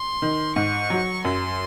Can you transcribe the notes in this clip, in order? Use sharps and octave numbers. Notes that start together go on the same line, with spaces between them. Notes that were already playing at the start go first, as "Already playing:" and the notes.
Already playing: C6
D#3
G#2 C#6
F#3
F#2 C6